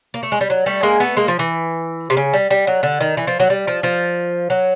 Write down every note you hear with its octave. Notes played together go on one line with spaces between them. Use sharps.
A#3
A3
G#3
G3
F#3
G3 A3
G#3 A#3
A3 B3
G#3 A#3
F3
E3
C3
C#3
G3
G3
F#3
D3
D#3
E3
F3
F#3
G3
F3
F3
F#3